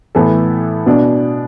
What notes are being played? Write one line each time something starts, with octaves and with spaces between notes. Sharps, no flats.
A2 E3 B3 E4 A4
B2 B3 D4